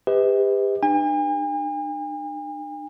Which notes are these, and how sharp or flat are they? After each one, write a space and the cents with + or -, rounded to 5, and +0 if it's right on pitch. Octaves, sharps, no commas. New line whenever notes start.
G4 +35 B4 +20 D#5 +45
D4 +45 G#5 -45